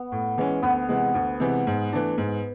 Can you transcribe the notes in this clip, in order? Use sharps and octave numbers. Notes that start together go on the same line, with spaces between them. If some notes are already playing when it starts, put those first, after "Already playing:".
Already playing: B3
A2
E3 G#3 C#4
D2 B3
C3 E3 G#3
D2
C3 E3 G#3
G#2
E3 A3 D4
G#2